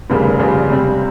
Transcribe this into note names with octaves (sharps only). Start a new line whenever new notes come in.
F1 D#2 C#3 G3 A#3
G1 F2 C#3 G3
C#2 C3 G3 C4